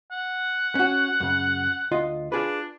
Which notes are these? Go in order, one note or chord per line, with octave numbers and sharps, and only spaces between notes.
F#5
C#4 F#4
F#2 C#3
D2 F4 D#5
D4 F4 G#4 B4